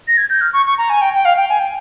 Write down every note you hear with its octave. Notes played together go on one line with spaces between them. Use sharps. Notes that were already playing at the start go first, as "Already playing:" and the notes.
A#6
G#6
G6
F6
C#6
C#6
A#5
G#5
G5
G5
F5
G5
G#5
G5